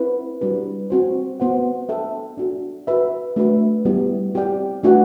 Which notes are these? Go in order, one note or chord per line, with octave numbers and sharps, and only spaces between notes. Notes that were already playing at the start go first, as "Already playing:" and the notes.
Already playing: C4 E4 B4
G3 D4 F#4 B4
C4 F#4 C5
B3 F#4 C5 F#5
D4 A4 E5 G5
D4 F#4 A4
F#4 B4 E5
A3 D4 F#4 B4 E5
G3 B3 E4 G4
C4 G4 D5 G5
A3 D4 F#4 B4 F#5